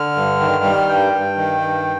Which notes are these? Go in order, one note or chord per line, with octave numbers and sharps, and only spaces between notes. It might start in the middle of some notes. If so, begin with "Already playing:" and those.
Already playing: D3 F6
G2
D#3
G3
G2 G5
G2
D#3
G2